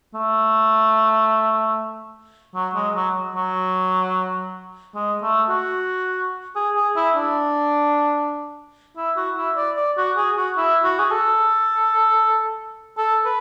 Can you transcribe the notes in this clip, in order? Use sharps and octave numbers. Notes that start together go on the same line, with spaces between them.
A3
F#3
G#3
F#3
F#3
G#3
A3
F#4
G#4
G#4
E4
D4
E4
F#4
E4
D5
D5
F#4
G#4
F#4
E4
F#4
G#4
A4
A4
B4